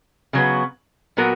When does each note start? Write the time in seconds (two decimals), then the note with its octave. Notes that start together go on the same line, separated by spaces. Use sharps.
0.33 C#3 F#3 B3
1.17 A#2 F#3 B3 F#4 A#4